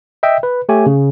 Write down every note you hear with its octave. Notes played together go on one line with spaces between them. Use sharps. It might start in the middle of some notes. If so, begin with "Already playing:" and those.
D#5 E5 G5
B4
A3 G4 C#5 G#5
C#3